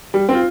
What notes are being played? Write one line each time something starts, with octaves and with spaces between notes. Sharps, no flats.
G3
C4 F4